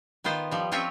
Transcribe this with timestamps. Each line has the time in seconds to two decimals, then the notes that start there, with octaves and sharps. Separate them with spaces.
0.24 D#3 B3 F4 C5
0.51 F3 G3
0.72 F3 C4 C#4 F4 C#5 E5